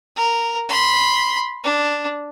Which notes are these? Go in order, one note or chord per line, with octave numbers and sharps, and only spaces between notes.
A#4
B5 C6
D4